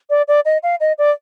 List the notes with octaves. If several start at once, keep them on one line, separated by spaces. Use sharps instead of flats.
D5
D5
D#5
F5
D#5
D5